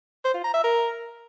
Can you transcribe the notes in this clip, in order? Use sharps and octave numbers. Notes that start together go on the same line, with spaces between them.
C5
F4
A#5
E5
A#4